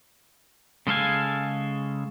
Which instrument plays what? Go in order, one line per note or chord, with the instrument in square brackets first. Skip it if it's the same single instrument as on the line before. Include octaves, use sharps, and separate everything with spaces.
[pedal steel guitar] C#3 G#3 A4 F5 G#5